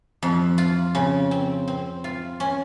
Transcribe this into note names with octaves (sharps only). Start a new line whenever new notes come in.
F2
F4
C#3
C4
C4
F4
C#4